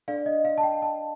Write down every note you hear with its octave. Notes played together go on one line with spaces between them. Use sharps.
D4 A4 D5 F5
D#5
F5
A5
G5
A5